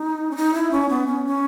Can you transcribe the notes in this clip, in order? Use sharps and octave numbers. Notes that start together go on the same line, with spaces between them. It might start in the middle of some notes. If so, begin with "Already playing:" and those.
Already playing: D#4
C#4
D#4
E4
C#4
B3
C#4
C#4